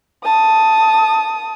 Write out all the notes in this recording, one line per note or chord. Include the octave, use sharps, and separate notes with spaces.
A5 D#6